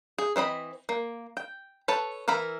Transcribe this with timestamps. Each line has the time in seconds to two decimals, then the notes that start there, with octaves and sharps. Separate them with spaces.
0.18 G#4
0.36 E3 C4 D#5 B5
0.89 A#3
1.37 G5
1.88 A4 B4 C#5 A5
2.28 E3 E4 A#4 B5